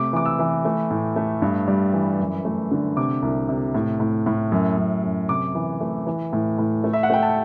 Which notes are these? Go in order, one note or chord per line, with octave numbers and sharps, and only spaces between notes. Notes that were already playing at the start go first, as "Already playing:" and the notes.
Already playing: C3 A3 D6
E3 D6
E6
E3
A3
A2
A3
G2
G3
E3
F#2
A3
D3
C3 D6
C2
C3
A2
A2
A2
F#2
F#2
F#2
C3 D6
E3
A3
E3
A2
A2
A3
E5
F#5
A3 G5
A5